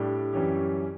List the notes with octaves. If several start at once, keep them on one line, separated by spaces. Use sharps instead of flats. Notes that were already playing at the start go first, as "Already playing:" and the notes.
Already playing: A2 G3 D4 G4
F#2 E3 G3 C#4 G4